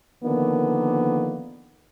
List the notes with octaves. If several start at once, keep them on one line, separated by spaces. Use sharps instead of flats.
D3 D#3 F3 A#3 B3